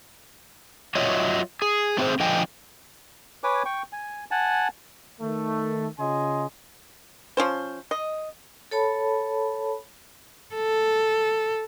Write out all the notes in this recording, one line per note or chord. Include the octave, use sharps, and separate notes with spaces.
F#3 F4 C#5 D#5 E5
G#4
A3 C4 F4 G#4 C5
D3 F3 D#5 G5 G#5
B4 C#5 G#5 D6
G5 C#6
G#5
F#5 G#5 A5
D#3 A3
C#3 F4 D#5 G#5 C6
F3 C#4 C5
D#5
A4 C#5 A5 B5
A4